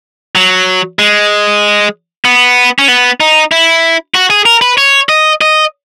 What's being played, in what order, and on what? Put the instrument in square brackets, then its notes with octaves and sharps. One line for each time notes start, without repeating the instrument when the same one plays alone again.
[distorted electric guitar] F#3
G#3
B3
C#4
B3
D#4
E4
F#4
G#4
A#4
B4
C#5
D#5
D#5